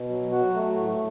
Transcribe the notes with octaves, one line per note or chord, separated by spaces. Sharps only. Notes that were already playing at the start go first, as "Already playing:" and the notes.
Already playing: B2
F#3
F#3 F#4
A3
A2